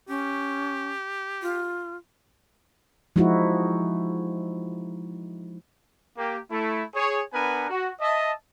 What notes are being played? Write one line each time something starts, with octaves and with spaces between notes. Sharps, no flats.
C#4 G4
F4
F3 G#3 D#4 E4 F#4
A#3 G4
A3 E4
G#4 C#5
B3 D4 A#4 B4 F#5 G#5
F#4
D#5 E5 A5